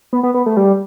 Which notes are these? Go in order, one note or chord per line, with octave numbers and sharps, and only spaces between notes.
B3
B3
B3
A3
G3